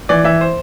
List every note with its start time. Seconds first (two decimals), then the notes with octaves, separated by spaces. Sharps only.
0.09 E3 D5
0.24 E3 E5
0.41 C5